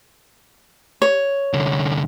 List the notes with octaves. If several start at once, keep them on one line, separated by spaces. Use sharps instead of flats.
C#5
C2 D3